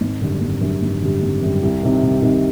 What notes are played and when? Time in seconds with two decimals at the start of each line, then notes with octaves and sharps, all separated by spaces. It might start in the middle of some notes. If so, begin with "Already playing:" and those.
0.01 G#1
0.22 F#2 D3 G3
0.42 G#1
0.61 F#2 D3 G3
0.82 G#1
1.02 F#2 D3 G3
1.22 G#1
1.42 F#2 D3 G3
1.63 C2
1.83 C3 D#3
2.03 C2
2.22 C3 D#3